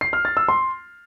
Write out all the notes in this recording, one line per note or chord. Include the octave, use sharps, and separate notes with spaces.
C7
F6
A6
E6
C6